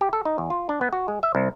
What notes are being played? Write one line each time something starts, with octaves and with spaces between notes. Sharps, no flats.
G4
A4
D#4
E2
F4
D4
B3
F#4
G#3
E5
C2